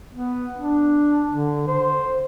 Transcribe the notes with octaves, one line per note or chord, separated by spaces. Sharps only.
B3
D4
D3
C5